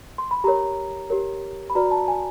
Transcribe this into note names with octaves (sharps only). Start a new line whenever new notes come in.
C6
B5
G4 A#4 C#5 A#5
G4 A#4 C#5
B5
F#4 B4 D5 A#5
A5
G#5